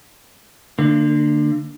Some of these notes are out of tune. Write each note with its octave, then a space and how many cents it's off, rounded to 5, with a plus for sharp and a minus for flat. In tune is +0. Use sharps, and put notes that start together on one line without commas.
D3 +20 A#3 -35